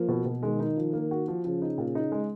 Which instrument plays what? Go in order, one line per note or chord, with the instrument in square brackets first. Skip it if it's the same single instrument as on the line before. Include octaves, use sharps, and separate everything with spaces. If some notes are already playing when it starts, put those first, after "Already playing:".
Already playing: [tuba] F3 [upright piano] A#3
[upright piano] B2
B2
[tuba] D#3 [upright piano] G#3
[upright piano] D#4
F3
A#3
F#4
F3
[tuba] C#3 [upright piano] F3
[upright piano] D#4
A#2
D#4
G#3